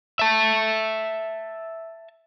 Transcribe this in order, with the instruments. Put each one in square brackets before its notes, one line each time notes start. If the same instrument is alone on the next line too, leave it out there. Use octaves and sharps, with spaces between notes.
[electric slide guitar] E5 A5